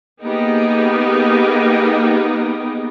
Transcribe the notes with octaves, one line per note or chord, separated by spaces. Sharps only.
A#3 B3 D#4 G4 G#4